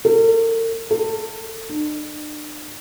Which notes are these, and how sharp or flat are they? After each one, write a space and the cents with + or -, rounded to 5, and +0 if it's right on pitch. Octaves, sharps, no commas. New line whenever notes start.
A#4 -45
A4 +30
D4 +45